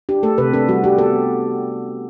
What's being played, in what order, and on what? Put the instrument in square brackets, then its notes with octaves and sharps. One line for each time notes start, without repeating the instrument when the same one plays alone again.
[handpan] D4 G4
A3 A4
C3 B4
D4 A4
G3 F#4
D4 G4
B3 A4